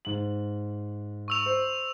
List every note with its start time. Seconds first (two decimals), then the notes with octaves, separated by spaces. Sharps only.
0.05 G#2 F#7
1.28 C#6 E6 F7
1.46 C5